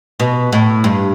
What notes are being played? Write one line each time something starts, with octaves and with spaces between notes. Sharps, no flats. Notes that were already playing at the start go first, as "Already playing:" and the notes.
B2
A2
G2